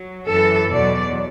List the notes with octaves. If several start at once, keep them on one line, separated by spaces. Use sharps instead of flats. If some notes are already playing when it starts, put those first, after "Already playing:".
Already playing: F#3
F#2 E3 A4
E2 B2 F#3 D5